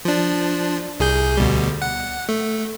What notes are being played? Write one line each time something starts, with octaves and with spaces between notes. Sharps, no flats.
F3 D4
C2 G#4 G6
D2 B2 G3
F#5
A3